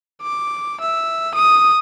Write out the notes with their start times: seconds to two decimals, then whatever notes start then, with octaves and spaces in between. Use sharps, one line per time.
0.22 D6
0.80 E5
1.34 D#6